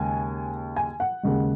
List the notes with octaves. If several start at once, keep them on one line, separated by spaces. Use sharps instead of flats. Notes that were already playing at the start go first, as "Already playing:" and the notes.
Already playing: D#2 C#3 G#3 G#5
G#5
F#5
D#2 C#3 G#3